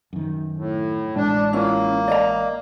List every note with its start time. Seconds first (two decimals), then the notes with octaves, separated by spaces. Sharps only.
0.13 F#2 D#3
0.57 A2
1.16 A1 A2 G#3 D4
1.53 A#3 C#4 E4 F4
2.08 D5 D#5 A#5